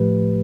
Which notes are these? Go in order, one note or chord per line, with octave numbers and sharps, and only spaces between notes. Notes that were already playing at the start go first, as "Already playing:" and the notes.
Already playing: A2 F3 A3 G4 B4